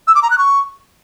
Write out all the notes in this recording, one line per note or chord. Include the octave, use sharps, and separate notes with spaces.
E6
D6
A#5
F#6
C#6